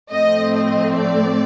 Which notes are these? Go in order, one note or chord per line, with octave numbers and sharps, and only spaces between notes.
A2 F3 A3 C4 D#5
D#5
D5